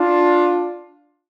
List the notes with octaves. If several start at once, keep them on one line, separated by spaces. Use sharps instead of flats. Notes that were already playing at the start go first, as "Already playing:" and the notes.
Already playing: D4 F4